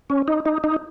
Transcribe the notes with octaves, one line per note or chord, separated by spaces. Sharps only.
C#4
D#4
D#4
D#4